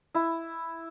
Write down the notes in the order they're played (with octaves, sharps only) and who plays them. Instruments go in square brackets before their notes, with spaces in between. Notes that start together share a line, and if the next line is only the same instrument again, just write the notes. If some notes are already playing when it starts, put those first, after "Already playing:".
[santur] E4